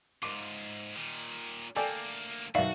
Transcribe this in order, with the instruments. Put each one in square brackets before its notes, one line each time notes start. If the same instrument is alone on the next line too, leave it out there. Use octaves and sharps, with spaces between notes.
[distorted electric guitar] G#2 F4 [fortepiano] D6
[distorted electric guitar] A#2 D#3
[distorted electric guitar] D2 A#3 [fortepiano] A4 D5 G5 [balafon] G#5
[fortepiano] B1 D#3 [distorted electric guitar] F#4 [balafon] D5 E5 F5